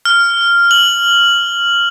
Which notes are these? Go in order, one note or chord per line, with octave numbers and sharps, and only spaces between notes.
F6
F#7